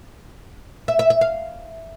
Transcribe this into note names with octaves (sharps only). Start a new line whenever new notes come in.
E5
E5
E5
F5